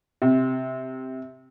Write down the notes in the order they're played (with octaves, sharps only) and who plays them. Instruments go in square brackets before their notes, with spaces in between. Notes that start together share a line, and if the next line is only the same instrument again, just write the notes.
[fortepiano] C3